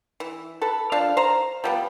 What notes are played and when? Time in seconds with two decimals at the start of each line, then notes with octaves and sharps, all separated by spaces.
0.20 E3
0.62 A4 B4
0.92 F3 D4 F5
1.17 C5 A#5
1.64 F3 G3 B3